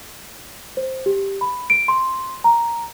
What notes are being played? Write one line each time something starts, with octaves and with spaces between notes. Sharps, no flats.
C5
G4
B5
D7
C6
A#5